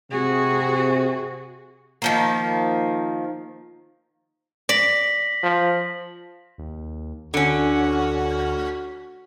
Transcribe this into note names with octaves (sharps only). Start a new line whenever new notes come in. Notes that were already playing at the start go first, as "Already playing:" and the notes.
C3 F#4 G#4
D#3 F3 A#3
D5 A#6 B6 F#7
F3
D#2
D2 D3 C#4 F#4